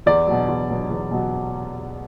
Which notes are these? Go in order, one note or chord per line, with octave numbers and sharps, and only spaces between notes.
E2 D5
B2 F#3
E2
B2 F#3
E2
B2 F#3